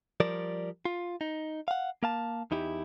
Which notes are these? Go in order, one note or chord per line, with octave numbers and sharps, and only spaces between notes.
F3 G3 A#4 D5
F4
D#4
F5 F#5
A#3 F5 A5
E2 D#4 E4 G4